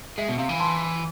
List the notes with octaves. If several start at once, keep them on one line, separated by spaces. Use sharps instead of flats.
G#3 E5
B2
C3 F5
E3
A5 C6